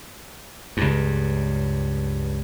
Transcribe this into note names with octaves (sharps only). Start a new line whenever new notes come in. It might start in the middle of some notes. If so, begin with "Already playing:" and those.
C#2 G2